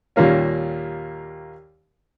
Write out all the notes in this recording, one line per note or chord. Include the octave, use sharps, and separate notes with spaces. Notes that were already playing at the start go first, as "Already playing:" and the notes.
D#2 A#2 G3 A#3 C#4